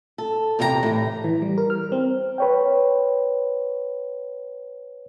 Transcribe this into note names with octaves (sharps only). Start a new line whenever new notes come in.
A4
E2 C3 G4 G#4 A#5
A2 E3
E3
G3
A#4
F6
C4
B4 C#5 G5